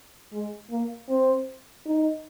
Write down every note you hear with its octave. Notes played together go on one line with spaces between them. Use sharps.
G#3
A#3
C4
D#4